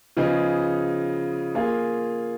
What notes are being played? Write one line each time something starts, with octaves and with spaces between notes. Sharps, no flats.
C#3 F3 B3 D#4 G#4
A#3 F4 G#4